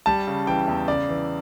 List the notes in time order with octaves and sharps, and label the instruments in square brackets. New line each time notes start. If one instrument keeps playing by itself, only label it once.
[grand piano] G3 A5
C#3
E3 G5
E2
C#3 D5
E3